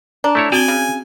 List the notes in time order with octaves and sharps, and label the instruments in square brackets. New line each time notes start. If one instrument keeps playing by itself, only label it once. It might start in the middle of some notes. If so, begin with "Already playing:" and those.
[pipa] D4 [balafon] A#5
[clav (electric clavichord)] A3 E4 C#5
[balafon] C4 F#4 [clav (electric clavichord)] D5 G5 [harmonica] G#5
[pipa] C#3